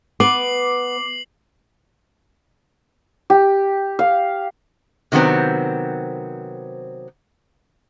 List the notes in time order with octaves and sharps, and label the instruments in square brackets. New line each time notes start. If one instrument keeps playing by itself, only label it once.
[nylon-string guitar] B3 [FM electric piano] D6 [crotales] C7 F#7
[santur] G4
F5
[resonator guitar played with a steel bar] C3 D#3 F#3 B3 C4